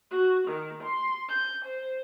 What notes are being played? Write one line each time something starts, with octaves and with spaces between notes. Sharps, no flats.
F#4
D#3
C6
G6
C5